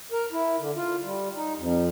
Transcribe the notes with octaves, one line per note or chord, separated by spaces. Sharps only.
A#4
E4
D3
F4
G3
D#4
F2